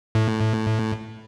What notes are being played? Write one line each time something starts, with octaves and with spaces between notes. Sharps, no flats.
A2